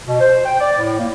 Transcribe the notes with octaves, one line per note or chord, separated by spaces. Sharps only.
B2
C5
G5
D5
A2
A#3